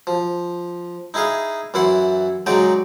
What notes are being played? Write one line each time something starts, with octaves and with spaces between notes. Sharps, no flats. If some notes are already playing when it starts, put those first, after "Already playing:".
F3
D#4 E4 G#4 D#5 F5
F#2 E3 E4 F#5 C6
C#3 F#3 G#3 D#4 D5 G5